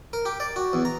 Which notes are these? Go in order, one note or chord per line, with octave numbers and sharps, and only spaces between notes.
A#4
G4
D5
F#4
E2
A#5